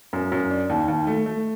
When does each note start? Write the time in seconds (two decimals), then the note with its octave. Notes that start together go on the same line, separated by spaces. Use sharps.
0.13 F#2
0.32 F#2
0.51 D4
0.69 D#2
0.88 D#2
1.07 A3
1.26 A3